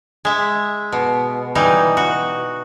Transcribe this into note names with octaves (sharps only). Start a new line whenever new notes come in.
G#3 E5
B2
E3 G3 D#4
F#4